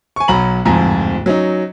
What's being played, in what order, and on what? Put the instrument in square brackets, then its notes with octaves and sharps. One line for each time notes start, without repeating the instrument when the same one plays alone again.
[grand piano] G#5 C#6
B1 F#3 F#5 A#5 B5 F#7
D1 F2 G#2 F3 G#5 A#5
F#3 C#4 D#4